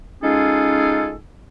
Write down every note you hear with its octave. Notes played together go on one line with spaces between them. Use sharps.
G#3 C#4 D#4 F4 G#4 A4